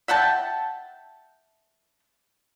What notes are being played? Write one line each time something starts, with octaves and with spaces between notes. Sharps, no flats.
E5 F#5 G5 A5